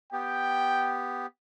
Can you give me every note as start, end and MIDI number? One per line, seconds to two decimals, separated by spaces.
0.13 1.26 59
0.13 1.26 67
0.13 0.97 79